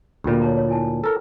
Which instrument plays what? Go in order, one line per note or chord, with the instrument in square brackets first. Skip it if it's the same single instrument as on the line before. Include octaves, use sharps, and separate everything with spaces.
[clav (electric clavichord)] D2 A#2 [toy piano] G4 G5 B5
[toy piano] C#5 A5 A#5
C#5
E4 G#5 A5
[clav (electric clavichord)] A4 A#4